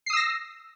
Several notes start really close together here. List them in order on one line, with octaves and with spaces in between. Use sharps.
C7 D#6 E6 A#6